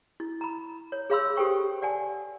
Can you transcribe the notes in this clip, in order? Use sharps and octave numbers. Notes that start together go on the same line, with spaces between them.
E4
A#5 B5
C#5
G#4 C#5 F5 B5 C6 E6
G4 A4 C5 G5 C#6
D5 F#5 G#5 A5